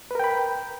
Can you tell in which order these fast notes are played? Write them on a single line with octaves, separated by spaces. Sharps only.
B4 A#4 G5 B5